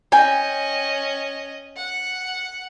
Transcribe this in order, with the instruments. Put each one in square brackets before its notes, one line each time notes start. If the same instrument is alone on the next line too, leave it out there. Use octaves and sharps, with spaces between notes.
[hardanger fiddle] C#4 D#5 [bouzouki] G5 G#5
[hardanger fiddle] F#5